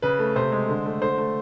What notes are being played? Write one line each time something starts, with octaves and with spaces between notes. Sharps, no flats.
C#3 B4
A3
C3 C5
G#3
D3
A3
D3 C5
A3